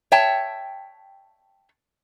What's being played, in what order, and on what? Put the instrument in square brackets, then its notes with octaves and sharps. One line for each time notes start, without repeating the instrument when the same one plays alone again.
[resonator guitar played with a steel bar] C#5 E5 G5 A5